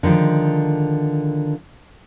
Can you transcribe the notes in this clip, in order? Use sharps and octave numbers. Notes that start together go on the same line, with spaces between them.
D3 D#3 F3 G#3